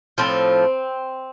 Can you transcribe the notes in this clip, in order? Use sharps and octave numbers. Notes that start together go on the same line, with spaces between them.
A2 F3 A3 C4